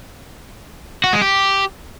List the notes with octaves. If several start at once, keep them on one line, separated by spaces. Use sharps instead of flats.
F#4
G#3
G4